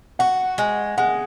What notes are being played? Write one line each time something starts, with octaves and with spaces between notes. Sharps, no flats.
F#4 F#5
G#3
G#3 F#5